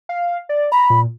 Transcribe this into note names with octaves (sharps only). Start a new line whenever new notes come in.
F5
D5
A#5 B5
A#2